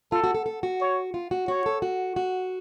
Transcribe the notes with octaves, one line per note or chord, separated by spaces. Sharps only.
F4 A4
F#4
A4
A4
F#4
C#5
F4
F#4
F#4 C#5
A4
F#4
F#4